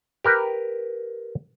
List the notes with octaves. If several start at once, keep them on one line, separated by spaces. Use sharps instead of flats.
G4 A#4 B4